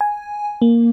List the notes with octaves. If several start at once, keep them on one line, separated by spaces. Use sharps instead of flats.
G#5
A#3